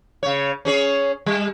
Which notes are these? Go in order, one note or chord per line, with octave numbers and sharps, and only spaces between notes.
C#3 C#5
C#4 G#4 C#5
G3